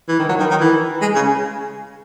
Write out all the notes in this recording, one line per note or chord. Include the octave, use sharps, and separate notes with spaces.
E3
D#3
F#3
D#3
D#3
E3
G#3
C#3